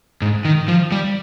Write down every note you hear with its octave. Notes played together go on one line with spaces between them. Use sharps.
G#2
D#3
F3
G3